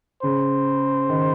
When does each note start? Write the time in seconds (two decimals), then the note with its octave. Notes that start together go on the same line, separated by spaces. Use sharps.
0.23 C#3 C5
1.09 D#3